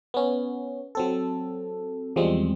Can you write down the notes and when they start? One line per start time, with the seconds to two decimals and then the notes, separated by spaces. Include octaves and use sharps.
0.14 B3 C#4
0.95 F#3 C4 A4
2.16 E2 F3 G3 G#3 C4